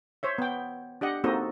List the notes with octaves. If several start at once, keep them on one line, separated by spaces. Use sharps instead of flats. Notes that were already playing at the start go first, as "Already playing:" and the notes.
C5 C#5 E5
B3 G5
D4 G4 D#5 F#5
A#3 C4 D#4 F#4 A4 D#5